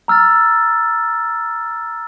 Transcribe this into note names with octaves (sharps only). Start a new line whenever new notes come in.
A#5 E6 F6 A6